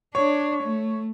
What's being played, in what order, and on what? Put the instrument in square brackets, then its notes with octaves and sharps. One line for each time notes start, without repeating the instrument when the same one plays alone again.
[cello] D4 [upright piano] C#5
[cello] A3